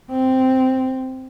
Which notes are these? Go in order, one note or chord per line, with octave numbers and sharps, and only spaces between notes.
C4